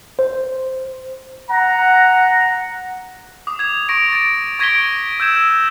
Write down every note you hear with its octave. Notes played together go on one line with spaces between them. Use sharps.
C5
F#5 A#5
D6 D#6
G#6 F7
C#6 A#6 D7 F7
A6 D7
C#6 G#6 A#6 B6 D7 G7
E6 G6 G#6 E7